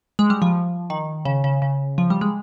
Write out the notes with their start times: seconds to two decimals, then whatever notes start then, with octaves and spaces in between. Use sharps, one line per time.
0.19 G#3
0.30 G3
0.42 F3
0.90 D#3
1.25 C#3
1.44 C#3
1.62 C#3
1.98 F3
2.10 G3
2.21 G#3